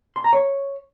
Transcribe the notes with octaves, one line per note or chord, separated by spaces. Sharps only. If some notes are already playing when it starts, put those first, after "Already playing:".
C6
A#5
C#5